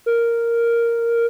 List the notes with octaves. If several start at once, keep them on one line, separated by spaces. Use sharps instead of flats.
A#4